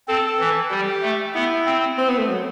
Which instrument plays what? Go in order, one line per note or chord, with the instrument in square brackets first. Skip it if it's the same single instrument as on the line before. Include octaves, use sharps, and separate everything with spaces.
[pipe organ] C4 [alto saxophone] A4
[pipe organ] E3
[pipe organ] G3 [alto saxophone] G4
[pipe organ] A3
[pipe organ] B3 [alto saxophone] E4
[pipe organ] C4
[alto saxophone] C4
B3
A3
F#3